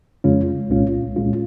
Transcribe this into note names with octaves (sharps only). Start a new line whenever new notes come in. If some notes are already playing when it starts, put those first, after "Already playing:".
F2 C#3 G#3 C#4 F4
C2 A#2 G#3 C#4 F4
C2 A#2 G#3 C#4 F4